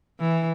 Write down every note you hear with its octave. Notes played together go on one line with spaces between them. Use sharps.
E3